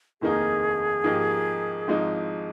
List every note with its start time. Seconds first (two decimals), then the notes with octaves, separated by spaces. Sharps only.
0.21 F1 D#2 D#3 A#3 D#4 G#4
1.04 G#2 F3 A#3 D#4 G4
1.88 G#1 G#2 F3 G#3 D#4